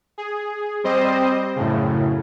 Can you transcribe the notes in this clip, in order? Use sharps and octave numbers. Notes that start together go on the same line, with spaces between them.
G#4
G3 C4 C5 D#5
F#2 A2 C#3